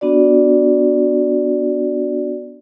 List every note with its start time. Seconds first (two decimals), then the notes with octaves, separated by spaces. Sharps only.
0.01 B3 D4 F#4 D5